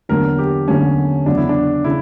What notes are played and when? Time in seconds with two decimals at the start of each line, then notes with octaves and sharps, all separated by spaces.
0.09 E2 D3 F#3 A#3 D4 A#4
0.38 G4
0.68 E2 D3 F#3 A#3 C#4 D4
1.26 E2 C#3 F#3 D4
1.37 E4
1.49 D4
1.84 C#3 E4